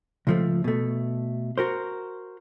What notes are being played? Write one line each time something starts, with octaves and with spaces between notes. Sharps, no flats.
C#2 F3 A3
B2 A3
F#4 A#4 C5